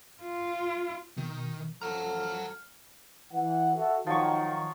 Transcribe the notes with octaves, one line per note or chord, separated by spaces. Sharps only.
F4
B2 D#3
F#2 F3 A4 F#5 A#5 F6
E3 F#5
F#4 A4 E5
D#3 F3 F#3 C#6